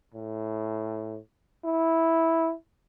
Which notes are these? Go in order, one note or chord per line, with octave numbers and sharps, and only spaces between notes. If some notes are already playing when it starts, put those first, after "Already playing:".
A2
E4